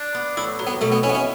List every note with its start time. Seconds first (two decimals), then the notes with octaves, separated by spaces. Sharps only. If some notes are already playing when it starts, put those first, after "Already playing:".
Already playing: D4
0.15 B3
0.37 A2 E4
0.59 F#3
0.67 B3
0.81 B2 A3
0.92 B3
1.03 C#4 E4
1.09 B3
1.15 C#4